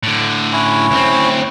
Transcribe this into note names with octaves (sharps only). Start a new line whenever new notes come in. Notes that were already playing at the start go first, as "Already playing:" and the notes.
A2 D3
C#4 E4 C#5
D2 C4